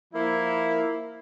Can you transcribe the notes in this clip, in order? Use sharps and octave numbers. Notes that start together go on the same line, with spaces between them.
F3 A#3 E4